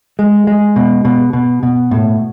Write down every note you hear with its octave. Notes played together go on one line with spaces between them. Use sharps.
G#3
G#3
B2
B2
B2
B2
A2